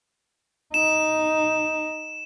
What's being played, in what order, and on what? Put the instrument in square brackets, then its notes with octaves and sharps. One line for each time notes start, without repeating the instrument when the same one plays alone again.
[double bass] D#4 [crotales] E7